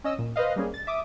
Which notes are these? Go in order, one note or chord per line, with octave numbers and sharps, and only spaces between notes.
C#4 D#5 E6
A#2
B4 C5 D#5 F5
G3 A#3 C#4 G#4
A6
E5 D6 D#6